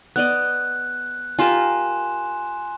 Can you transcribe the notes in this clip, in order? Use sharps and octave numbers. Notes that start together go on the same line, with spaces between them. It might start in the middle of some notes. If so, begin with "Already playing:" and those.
B3 D5 D#5 F#6
F4 G4 A#4 G#5 C6 E7